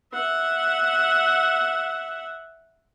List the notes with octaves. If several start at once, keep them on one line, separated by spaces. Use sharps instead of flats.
E5 F#5